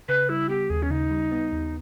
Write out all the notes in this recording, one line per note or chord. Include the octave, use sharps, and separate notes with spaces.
C#3 B4
G3 E4
B3 G4
D#2 G#4
C#4
C#3 D#4
G3
B3
D#2